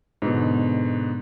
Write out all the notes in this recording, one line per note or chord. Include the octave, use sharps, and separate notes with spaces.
G#2 B2 D3